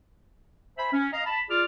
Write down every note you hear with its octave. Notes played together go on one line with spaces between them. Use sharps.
C5 E5 G#5 B5
C#4
D#5 F5 A#5
A5 B5
F4 G#4 D5 D6 F6